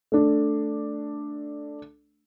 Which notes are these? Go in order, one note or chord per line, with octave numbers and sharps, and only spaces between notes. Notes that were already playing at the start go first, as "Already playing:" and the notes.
A3 D4